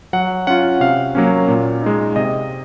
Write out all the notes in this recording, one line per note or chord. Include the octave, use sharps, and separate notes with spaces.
F#3 F#5
C#4 F4 F#5
C3 F5
F#3 A#3 C#4
A#2
G#3 D#4
C3 D#5